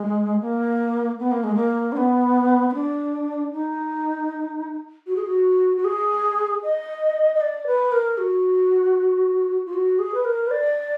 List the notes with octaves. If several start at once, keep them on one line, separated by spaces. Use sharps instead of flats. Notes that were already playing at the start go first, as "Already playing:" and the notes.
Already playing: G#3
A#3
B3
A#3
G#3
A#3
D4
B3
B3
D4
D#4
F#4
G#4
F#4
F#4
G#4
D#5
D#5
D5
B4
A#4
F#4
F4
F#4
G#4
B4
A#4
B4
D5